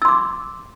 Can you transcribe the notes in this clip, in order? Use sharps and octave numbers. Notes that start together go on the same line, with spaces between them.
C6 D6 E6